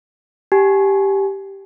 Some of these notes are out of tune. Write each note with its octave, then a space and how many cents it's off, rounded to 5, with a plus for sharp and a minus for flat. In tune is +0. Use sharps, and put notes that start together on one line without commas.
G4 +0 G#5 +30